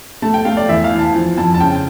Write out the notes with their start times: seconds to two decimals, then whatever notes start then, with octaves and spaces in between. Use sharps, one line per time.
0.22 A3 A5
0.34 G5
0.45 A3 F5
0.57 D5
0.68 E2 E5
0.84 F5
0.92 E3
0.99 A5
1.14 F3
1.38 F2 A5
1.54 A5
1.61 C#3 G5